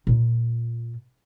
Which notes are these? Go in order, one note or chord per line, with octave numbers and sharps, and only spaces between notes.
A#2 F4